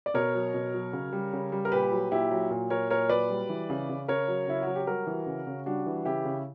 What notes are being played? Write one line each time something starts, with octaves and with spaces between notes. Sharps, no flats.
D5
B2 A#4 C#5
F#3
B2
F#3
C#3
G3
C#3
G3
A#4
A#2 G4 B4
F#3
A#2 E4 G4
F#3
A#2
F#3 A#4 C#5
A#2 A#4 C#5
F#3 B4 D5
G3
E3
C#3
C#3
C#3 A#4 C#5
F#3
C#3 E4
F#3 F#4
G4
G3 F#4 A#4
E3
C#3
C#3
G3 D4 F#4
E3
C#3 E4 G4
C#3